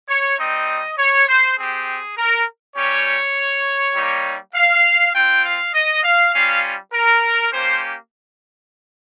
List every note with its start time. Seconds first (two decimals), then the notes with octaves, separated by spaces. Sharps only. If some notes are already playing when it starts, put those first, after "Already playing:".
0.09 C#5
0.39 G3 C4 D#4 D#5
0.99 C#5
1.28 C5
1.58 C4 G4 G#4
2.17 A#4
2.77 G3 C#4 G4 C#5
3.95 G3 A#3 D#4 G4
4.55 F5
5.15 C4 F4 G5
5.45 F5
5.74 D#5
6.04 F5
6.34 G3 C#4 F4 F5
6.93 A#4
7.53 A#3 C#4 G4 C5